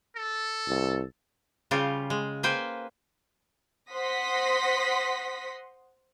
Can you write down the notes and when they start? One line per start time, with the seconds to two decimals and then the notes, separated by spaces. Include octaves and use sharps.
0.16 A4
0.68 C2
1.71 C#3 G3 F4 G4
2.10 G#3
2.43 A#3 B4 C5 G5 G#5
3.92 C5 F#5 C6 D#6 A#6 B6